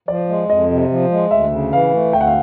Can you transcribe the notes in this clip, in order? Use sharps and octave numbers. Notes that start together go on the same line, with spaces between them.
F3 D5
G#3
F2 D#5
C3
F3
G#3
D2 E5
C#3
E3 F5
A3
D2 G5
F#5
F5